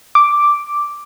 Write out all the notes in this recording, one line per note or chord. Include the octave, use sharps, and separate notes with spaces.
D6